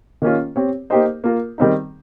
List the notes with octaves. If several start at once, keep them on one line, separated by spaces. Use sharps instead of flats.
D#3 A#3 C#4 F4
C4 G4 C#5
A#3 D#4 G4 C5 D#5
A#3 F4 A#4
D#3 G3 C4 D#4